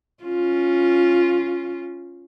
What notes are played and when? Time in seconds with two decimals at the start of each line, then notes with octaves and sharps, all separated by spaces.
0.23 C#4 F4